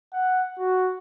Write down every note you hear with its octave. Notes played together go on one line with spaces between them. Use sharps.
F#5
F#4